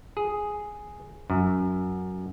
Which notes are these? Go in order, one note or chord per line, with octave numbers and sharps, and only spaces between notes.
G#4
F#2